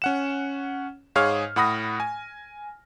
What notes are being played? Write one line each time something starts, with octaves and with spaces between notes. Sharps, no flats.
C#4 F#5 E7
G#2 G#4 C#5 F5 F6
A2 F#5 B5 D#6 A#6
G#5